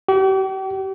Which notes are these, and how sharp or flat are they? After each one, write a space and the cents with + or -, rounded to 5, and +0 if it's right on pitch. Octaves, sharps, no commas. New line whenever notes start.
G4 -40